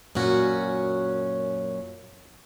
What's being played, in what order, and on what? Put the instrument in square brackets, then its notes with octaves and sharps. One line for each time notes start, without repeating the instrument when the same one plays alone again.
[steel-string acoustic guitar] F#2 A#2 C#4 F#4